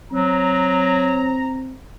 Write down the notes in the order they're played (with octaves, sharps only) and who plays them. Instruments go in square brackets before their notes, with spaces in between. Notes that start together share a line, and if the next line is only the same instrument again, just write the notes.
[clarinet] F#3 [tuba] C4 [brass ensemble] A#5